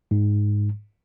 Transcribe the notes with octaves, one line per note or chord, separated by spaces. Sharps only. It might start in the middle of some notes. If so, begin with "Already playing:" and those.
G#2